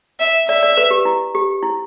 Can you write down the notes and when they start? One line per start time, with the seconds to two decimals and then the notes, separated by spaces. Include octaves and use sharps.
0.19 E5
0.48 D5 E5
0.63 D5
0.77 B4
0.91 G4
1.05 E4
1.35 G4
1.63 E4